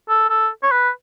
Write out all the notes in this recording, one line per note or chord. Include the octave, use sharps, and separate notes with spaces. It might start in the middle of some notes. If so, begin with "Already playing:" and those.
A4
A4
C#5
B4